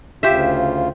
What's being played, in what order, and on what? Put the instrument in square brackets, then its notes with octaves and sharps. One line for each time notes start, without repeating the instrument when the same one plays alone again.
[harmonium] D2 C#3 F4 [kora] G4 C5 E5